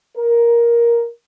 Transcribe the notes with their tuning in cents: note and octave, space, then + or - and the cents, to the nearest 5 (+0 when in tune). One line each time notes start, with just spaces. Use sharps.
A#4 +10